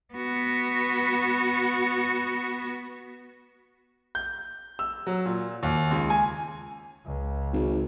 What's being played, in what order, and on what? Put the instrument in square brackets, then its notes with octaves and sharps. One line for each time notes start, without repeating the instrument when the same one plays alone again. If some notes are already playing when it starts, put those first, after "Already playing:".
[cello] B3 F#4
[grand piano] G6
E6
F#3
A#2
D#2
C#2
G#5
[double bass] C#2
[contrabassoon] G#1